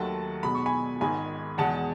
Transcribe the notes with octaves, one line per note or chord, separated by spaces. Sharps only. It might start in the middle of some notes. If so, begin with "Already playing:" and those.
Already playing: D#2 D#3 F#3 A3 F#5 A5
B1 B2 G#3 B5
C#6
G#5 B5
G#1 G#2 D#3 G#3 G#5 B5
E2 B2 G#3 F#5 A5